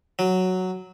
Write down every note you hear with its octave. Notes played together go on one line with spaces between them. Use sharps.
F#3